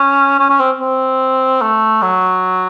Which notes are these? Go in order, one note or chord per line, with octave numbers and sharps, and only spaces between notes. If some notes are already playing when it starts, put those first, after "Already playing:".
Already playing: C#4
C#4
C#4
C4
C4
A3
F#3